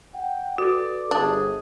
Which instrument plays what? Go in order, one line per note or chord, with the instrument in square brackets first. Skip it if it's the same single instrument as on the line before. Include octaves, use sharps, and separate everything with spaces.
[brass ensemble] F#5 G5
[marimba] F#4 [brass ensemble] A4 B4 [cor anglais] D5
[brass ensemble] G1 [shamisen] D4 [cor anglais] G#4